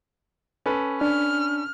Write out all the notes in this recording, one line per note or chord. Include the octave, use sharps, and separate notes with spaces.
C#4 A4 B4
D4 F6